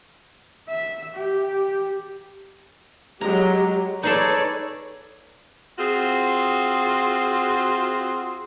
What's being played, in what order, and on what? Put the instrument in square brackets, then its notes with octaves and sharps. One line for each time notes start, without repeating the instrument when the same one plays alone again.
[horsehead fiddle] E5
G4
[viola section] F#3 G#3 G4 [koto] A#5
[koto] D#4 G#4 A4 [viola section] B4 C#5 D5
[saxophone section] C4 F4 F#4 G#4